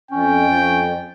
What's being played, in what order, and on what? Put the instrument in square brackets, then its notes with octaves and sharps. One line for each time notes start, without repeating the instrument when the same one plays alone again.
[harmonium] F2 [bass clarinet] C#4 [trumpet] G5
[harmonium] F2